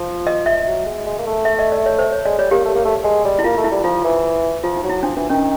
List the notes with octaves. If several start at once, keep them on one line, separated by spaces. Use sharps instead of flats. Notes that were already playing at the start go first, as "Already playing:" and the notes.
Already playing: F3
D#5
E5
F#3
G#3
G#3
A#3
A3
E5
D#5
D5
C#5
C5
C#5
G#3 D5
G3 C#5
A#3 G4
A3
A#3
A3
G#3
G3
E4
A#3 F4
A3
E4
G3
F3 F4
E3
F3 F4
D#4
F#3
E4
F3 D4
E3 D4
D#3 C#4